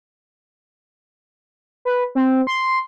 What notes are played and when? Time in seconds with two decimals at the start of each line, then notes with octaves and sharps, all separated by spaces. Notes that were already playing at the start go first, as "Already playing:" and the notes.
1.85 B4
2.15 C4
2.47 C6